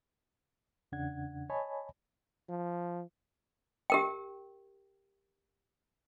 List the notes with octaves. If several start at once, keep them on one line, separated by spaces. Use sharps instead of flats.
E2 C#3 D4 F#5 G#6
C#5 D#5 G#5 A5 B5
F3
G4 A#4 G5